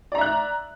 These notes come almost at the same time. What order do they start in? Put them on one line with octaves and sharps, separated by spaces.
D5 A#5 E5 F#6